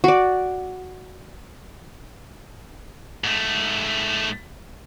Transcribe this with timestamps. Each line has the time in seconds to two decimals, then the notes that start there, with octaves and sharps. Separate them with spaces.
0.04 F#4 D5
3.24 G#2 A3